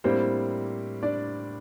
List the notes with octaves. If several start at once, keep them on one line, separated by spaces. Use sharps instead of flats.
A2 G3 A#3 C4 D4 C5
D4 D5